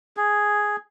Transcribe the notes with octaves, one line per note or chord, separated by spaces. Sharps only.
G#4